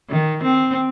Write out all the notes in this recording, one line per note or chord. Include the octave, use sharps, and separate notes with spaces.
D#3
C4